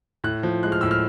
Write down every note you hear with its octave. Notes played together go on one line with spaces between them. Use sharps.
A2 F#6
F3
G#3 F#6
F6
A2 E6
F6